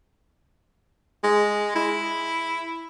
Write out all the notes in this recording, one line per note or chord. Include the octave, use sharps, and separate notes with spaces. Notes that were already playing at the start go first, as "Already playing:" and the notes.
G#3
E4